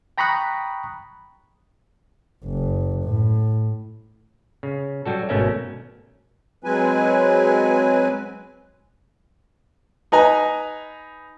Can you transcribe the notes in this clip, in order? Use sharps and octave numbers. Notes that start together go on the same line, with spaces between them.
G5 A#5 B5 C#6 D#6 F#6
F#1
A2
C#3
F#3 G3 F#4 A4
G#1 B2 A3 C#4 A#4 E5
F#3 G#3 C4 B4 G#5
D#4 B4 G#5 A#5